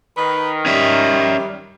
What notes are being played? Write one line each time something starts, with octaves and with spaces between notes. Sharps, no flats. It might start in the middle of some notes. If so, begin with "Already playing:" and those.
D#3 B4
G3 C#4 E5